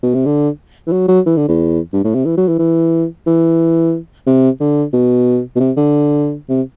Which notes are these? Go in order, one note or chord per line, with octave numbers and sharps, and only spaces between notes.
B2
C3
D3
E3
F#3
F#3
E3
D3
E2
G2
A2
C3
E3
F#3
E3
E3
E3
C3
D3
B2
B2
C3
D3
C3